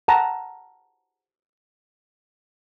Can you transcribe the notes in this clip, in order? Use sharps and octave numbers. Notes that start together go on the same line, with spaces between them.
F#5 A5 A#5